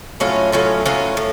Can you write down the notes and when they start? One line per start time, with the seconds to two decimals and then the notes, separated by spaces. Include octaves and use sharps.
0.20 A2 F#3 C#4 F4
0.52 A2 F#3 C#4 F4
0.86 A2 F#3 C#4 F4
1.17 A2